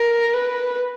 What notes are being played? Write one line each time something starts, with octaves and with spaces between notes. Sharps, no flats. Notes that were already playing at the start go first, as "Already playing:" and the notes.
Already playing: A#4
B4